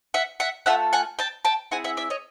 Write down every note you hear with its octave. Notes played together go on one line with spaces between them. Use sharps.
E5 F#5
E5 F#5
A3 C#4 F4 A4 E5 F#5
F#5 G#5
G5 A5
G5 A5
C4 E4 G#4 F#5 G#5
E5 F#5
D5 E5
C#5 D#5